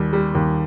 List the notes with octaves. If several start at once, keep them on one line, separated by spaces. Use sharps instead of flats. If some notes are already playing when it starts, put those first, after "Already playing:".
Already playing: D#2 G3
G3
D#2